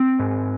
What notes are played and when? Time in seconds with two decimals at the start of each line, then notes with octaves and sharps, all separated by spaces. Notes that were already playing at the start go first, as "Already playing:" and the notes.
Already playing: C4
0.19 G#2